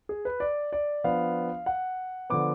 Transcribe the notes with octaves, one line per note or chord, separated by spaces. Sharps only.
G#4
B4
D5
D5
F3 B3 D4 F5
F#5
D3 F3 B3 D6